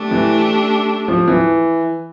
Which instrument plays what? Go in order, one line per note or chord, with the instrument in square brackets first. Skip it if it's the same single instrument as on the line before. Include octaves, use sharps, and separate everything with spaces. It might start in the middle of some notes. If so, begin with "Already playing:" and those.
Already playing: [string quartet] A3 D4 G4
[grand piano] E3
F3
E3